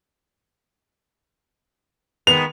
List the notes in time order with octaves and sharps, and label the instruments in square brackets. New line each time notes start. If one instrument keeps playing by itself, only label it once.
[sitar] D#3 G#3 B3 [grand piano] F7